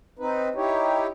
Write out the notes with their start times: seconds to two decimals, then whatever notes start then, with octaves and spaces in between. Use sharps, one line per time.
0.19 C4 D#4 B4
0.55 D#4 E4 G4 C#5